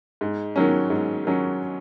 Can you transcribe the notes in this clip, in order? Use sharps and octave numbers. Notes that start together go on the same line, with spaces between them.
G#2
D#3 F#3 C#4
G#2
D#3 F#3 C#4